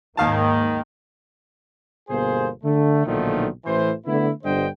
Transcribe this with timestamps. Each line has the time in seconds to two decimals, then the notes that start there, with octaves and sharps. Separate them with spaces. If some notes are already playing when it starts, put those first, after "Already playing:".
0.17 D#2 G#2 D#3 A#3 F5 A5
2.10 G1 B2 A#3 G#4 C5
2.64 D3 A3
3.06 B1 A#2 D3 D#3 F3 A3
3.65 A1 E3 C5
4.06 D3 A3 B3 E4
4.44 G1 G2 D3 C5 D#5 G5